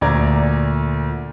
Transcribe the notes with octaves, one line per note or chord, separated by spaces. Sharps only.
D2 A#2 D5 A#5 G#6